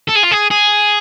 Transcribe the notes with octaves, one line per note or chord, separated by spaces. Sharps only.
A4
G#4
F4
G#4
G#4